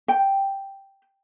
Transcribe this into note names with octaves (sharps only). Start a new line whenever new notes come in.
G5